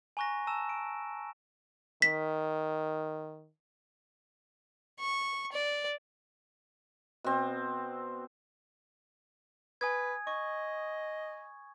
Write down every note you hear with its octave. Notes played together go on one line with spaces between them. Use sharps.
G#5 A#5 C#6 F#6 A#6
A5 A#5 E6 E7
D7
D#3 B6
C#6
D5
B2 C4
B4 G#5 D#6 G#6
D#5 C#6